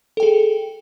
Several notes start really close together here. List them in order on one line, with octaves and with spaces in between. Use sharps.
A4 G5 G#4